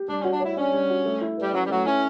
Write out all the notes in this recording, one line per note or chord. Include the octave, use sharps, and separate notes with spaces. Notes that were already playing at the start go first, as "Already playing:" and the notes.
Already playing: G4
G3 D4
C#4
F#4
D4
E4 C#5
C#4 D4
G3
F#4
A3
E4
G3 B4
F#3 C#4
G3
F#3 A3
C#4 E4